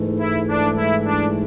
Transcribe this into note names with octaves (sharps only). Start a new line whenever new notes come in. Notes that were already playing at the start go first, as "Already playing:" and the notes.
Already playing: G#2 E3 A3
E4
D4
E4
D4